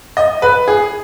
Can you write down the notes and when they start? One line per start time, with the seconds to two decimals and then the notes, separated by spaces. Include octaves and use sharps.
0.17 D#5
0.42 B4
0.68 G#4